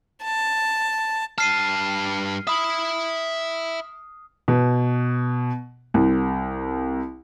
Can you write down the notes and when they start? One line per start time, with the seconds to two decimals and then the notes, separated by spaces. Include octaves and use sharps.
0.25 A5
1.38 G2 A5 F6 C7 D#7
2.47 E5 B5 D#6
4.48 B2
5.94 C2